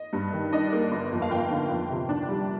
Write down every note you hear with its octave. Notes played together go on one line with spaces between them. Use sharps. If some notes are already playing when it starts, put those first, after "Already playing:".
Already playing: D#5
G2
D#3
D4 D#5
A#3
G1
F2
F5
G1 G5
D3
F2
C3
D4
G3